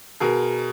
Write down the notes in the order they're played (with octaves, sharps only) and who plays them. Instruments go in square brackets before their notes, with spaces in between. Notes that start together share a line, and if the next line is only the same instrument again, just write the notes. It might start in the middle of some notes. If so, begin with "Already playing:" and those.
[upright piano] B2 G#4 A#4